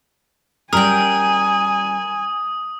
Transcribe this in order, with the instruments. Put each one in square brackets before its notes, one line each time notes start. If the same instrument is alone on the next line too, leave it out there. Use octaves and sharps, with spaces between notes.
[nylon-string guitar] G3 C#4 [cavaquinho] A#4 G5 [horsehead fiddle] G#5 [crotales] D#6